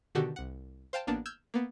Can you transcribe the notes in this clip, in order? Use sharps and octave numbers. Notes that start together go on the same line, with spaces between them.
B2 D3 D#3 F#4 G4 A4
C2 F#5
C5 F5 G5 A5
A1 A#3 B3 D4 A5
E6 F6 G6 G#6
A#3 B3